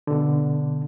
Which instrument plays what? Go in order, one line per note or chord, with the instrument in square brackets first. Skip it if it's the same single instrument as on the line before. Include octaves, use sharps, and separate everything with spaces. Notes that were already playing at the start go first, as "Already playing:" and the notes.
[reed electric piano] B2 D3